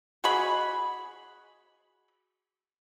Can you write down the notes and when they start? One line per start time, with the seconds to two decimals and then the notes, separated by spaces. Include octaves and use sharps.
0.24 F#4 G#4 D#5 B5